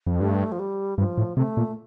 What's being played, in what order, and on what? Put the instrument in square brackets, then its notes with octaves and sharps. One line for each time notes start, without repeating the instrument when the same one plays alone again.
[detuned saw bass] F2
[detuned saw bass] G2 [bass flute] A3
[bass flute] F3
G3
[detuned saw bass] G2 [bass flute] F3
[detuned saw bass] A2
[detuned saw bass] C3 [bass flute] A3
[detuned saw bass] A#2